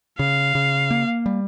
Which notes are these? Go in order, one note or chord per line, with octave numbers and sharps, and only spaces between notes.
C#3 F5
C#3
A#3
G3